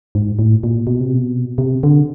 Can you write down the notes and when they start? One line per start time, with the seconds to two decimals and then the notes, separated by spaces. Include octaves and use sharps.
0.15 G#2
0.39 A2
0.63 A#2
0.87 B2
1.00 C3
1.14 B2
1.58 C3
1.83 D3